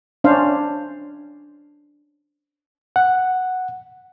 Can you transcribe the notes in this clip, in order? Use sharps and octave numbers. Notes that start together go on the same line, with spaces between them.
C#4 D4 C5 F5
F#5